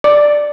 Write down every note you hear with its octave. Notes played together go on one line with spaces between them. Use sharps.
D5